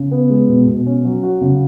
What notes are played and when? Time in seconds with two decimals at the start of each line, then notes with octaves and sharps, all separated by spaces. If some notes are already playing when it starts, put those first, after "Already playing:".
Already playing: C#3
0.11 B3
0.30 G#3
0.49 B2
0.67 B2
0.86 C#4
1.05 F#3
1.23 F#4
1.41 C#3